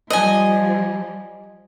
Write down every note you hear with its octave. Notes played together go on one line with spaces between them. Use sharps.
F3 G3 D#5 G#5